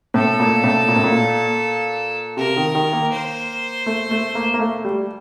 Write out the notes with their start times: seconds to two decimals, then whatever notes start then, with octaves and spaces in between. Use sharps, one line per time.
0.14 A2 A4
0.40 A#2
0.64 A2
0.88 A#2
0.96 A2
1.04 A#2
2.37 C3 A#4
2.57 D#3
2.75 D#3
2.93 A#3
3.12 C5
3.86 A3
4.11 A3
4.35 A#3
4.54 A#3
4.60 A3
4.85 G3